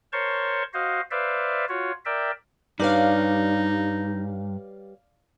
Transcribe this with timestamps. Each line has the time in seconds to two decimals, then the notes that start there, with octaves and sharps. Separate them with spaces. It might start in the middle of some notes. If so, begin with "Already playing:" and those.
0.12 A#4 C5 C#5 A5 C6 C#6
0.74 F#4 C5 D#5 F5
1.11 B4 C5 D5 E5 F5
1.69 F4 F#4 C#5
2.05 A#4 D5 E5 G5
2.80 G2 G3 D#4 B4 C#5 D5 F5